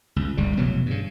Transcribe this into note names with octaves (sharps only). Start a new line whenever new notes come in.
C#2
G1 C#2 C#3 G3
F1 B2 E3 F#3
G2 C#3